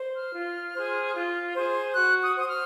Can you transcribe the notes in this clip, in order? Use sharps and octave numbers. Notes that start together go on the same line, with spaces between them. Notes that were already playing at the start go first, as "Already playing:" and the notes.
Already playing: C5
F6
F4
G#4 C5
F4
G#4 C5
F#4 F#6
D#6
C5 D#6
F6